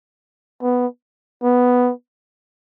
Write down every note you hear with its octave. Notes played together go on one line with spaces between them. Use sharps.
B3
B3